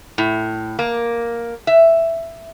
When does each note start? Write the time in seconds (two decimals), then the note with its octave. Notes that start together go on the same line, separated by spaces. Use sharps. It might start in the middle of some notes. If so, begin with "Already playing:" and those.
0.18 A2
0.79 A#3
1.67 E5